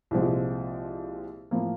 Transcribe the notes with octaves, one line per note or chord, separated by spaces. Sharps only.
C2 A#2 F3 G#3 C4
A2 F3 A#3